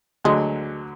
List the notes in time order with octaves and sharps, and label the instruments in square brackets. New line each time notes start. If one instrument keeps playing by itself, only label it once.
[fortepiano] D2 D3 F#3 [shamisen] G#3